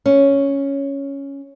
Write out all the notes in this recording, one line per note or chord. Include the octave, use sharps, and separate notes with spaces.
C#4